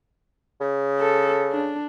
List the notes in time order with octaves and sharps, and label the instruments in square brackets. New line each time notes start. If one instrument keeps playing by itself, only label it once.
[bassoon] C#3
[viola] A4
D4